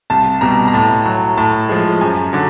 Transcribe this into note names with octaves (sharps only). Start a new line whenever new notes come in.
C2 A5
B2 G3 A#5
A#5
A2 A5
F#3
A2 A5
F3 G#3
F#2 G#5
D3 F#3